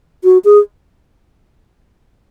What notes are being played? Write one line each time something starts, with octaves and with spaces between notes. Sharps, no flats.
F#4
G#4